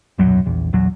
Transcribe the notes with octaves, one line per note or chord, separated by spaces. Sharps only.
D#1 B1 F#2 F#3
A#1 E2
A#1 E2 F#3